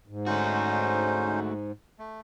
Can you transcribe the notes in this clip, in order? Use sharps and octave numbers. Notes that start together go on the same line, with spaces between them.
G#2
A3 C#4 D#4 F#4 C5
A3